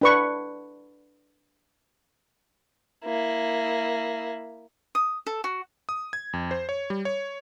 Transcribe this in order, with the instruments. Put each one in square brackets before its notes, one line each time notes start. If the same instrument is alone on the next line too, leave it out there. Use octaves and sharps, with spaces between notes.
[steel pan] D4 B4 C#6
[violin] A#3 E4
[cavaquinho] D#6
A4
F#4
[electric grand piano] D#6
G#6
F2
C5
C#5
G3
C#5